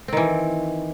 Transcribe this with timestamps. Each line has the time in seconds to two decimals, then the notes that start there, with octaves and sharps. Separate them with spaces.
0.08 C4
0.13 D#3
0.17 E3